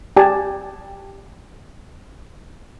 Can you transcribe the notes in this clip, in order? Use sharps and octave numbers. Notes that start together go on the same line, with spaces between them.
G4 D5 G#5 A5